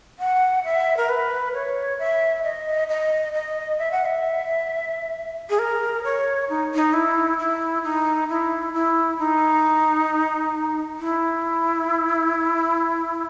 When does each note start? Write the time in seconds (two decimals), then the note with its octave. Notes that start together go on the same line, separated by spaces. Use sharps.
0.19 F#5
0.64 E5
0.97 A#4
1.09 B4
1.53 C#5
1.99 E5
2.43 D#5
2.89 D#5
3.33 D#5
3.79 E5
3.92 F#5
4.05 E5
5.50 G#4
5.59 A#4
6.04 C#5
6.49 D#4
6.74 D#4
6.93 E4
7.38 E4
7.84 D#4
8.29 E4
8.73 E4
9.19 D#4
10.99 E4